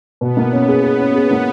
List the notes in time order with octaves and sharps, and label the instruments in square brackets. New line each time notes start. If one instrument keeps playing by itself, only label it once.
[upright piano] B2 [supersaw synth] B3
[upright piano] A#3
[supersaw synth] B3 [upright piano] C#4
[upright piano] G#4
[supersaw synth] B3 [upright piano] G#4
[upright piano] C#4
G#4
A#3